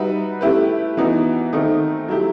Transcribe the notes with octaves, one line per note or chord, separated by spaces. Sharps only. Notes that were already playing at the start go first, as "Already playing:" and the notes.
Already playing: G3 D#4 F#4 B4 E5
A3 E4 G4 B4
E3 B3 D#4 F#4
D#3 A3 C4 D#4
F#3 A3 E4 G4